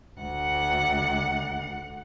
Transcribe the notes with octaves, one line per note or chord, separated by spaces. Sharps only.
D2 F#5